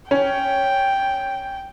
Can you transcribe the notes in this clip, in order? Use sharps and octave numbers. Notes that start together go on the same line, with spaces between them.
C#4 G5